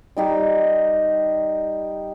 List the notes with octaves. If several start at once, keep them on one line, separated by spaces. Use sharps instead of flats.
G3 D#4 G4